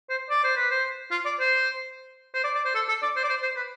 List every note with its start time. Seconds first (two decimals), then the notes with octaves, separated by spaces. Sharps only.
0.09 C5
0.30 D5
0.43 C5
0.56 B4
0.70 C5
1.11 F4
1.25 D5
1.39 C5
2.34 C5
2.44 D5
2.55 D5
2.65 C5
2.75 A4
2.88 A4
3.02 D5
3.16 C5
3.23 D5
3.29 C5
3.42 C5
3.56 B4